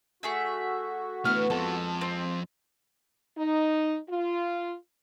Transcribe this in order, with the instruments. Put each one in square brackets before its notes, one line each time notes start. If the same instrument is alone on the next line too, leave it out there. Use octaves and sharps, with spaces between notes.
[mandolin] A3 G#4 E5 [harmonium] F#4
[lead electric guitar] A2 A3 [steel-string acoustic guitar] D3 E3 B3 [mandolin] F6
[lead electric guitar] F2 F3 [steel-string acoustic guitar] G#3 [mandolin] A4
[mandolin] C4
[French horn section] D#4
F4